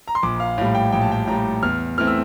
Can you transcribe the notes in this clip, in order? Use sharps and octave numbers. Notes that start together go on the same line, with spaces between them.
A#5
C6
A#1 D6
F5
A2 G3 F5
G5
A#1 G5
A5
G5
A2 G3 A#5
E2 F6
E3 A3 C4 E4 F6
E6